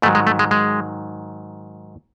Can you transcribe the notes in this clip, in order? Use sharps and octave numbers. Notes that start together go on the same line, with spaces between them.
G#2 D#3 F#3 A3
G#3
A3
G#3
G#3